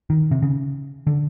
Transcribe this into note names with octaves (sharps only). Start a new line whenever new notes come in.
D#3
C3
C#3
D3